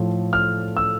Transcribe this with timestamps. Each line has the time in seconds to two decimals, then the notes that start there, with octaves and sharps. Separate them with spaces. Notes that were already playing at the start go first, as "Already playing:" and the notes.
Already playing: A2 F3 A3
0.33 F6
0.77 E6